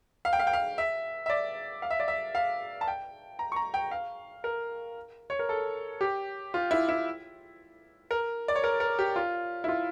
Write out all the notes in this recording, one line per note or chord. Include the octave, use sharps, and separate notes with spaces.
F5
G5
F5
G5
F5
E5
E5
D5
F5
E5
D5
E5
F5
A5
G5
A#5
C#6
A#5
G5
F5
A#4
C#5
A#4
A4
G4
F4
E4
E4
A#4
D5
C#5
A#4
A#4
G4
F4
E4
F4